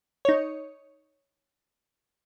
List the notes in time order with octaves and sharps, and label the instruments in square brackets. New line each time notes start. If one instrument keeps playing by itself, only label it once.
[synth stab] D#4 C#5